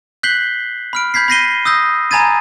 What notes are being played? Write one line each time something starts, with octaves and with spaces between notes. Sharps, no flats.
F#6 G6 B6 C7 F#7 G7
B5 F6 D7
B5 G6 G#6 B6 C7
B5 G6 A#6 C7 D#7 G7
D#6 E6 G6 A#6
G#5 A#5 B5 G#6 A6 D#7